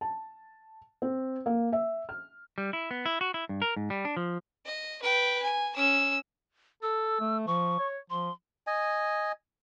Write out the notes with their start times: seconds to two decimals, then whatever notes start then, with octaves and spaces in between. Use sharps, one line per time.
0.01 A5
1.02 C4
1.46 A#3
1.72 E5
2.09 F6
2.58 G3
2.73 E4
2.91 B3
3.06 E4
3.21 F#4
3.34 E4
3.49 G2
3.62 A#4
3.77 G#2
3.90 G3
4.05 D4
4.17 F3
4.66 D#5
5.02 B4 G5
5.42 G#5
5.75 C#4 E6
6.83 A4 E6
7.20 A3
7.47 F3 C#6
7.79 C#5
8.10 F3 C6
8.67 D#5 G#5